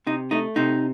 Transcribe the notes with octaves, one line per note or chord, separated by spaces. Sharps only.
C3 D#4
A3 D#4
C3 D#4